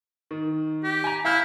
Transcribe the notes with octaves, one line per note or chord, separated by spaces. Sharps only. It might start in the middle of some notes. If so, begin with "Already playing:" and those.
D#3
G4
G#5 A#5
E4 F5 F6 G6